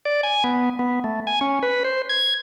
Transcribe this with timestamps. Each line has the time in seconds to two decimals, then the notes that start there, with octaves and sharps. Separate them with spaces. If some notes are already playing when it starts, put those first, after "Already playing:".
0.05 D5
0.23 G#5
0.44 B3
0.79 B3
1.04 A3
1.27 G#5
1.41 C#4
1.63 B4
1.84 C5
2.09 G#6